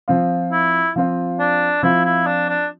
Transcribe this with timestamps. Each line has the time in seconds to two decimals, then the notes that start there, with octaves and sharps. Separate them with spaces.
0.08 F3 C4 F4
0.51 E4
0.96 F3 C4 F4
1.39 D4
1.83 F3 C4 E4 F4
2.05 E4
2.27 D4
2.49 D4